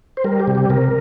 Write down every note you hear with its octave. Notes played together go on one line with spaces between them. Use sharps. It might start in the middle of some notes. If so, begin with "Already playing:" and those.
C5
G3 A#4
G4
C3
G4
C3 A#4